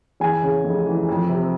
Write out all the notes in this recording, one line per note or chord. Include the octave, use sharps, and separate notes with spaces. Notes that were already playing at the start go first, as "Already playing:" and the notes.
E2 G#5
C#3
F1
E3
F2
C3